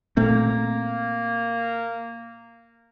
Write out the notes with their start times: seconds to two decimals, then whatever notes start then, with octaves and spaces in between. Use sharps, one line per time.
0.17 A#2 A3 A#3 C4